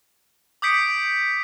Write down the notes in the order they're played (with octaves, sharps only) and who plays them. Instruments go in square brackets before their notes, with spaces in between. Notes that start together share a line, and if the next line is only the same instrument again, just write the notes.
[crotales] D6 D#6 G6 B6 C#7 D7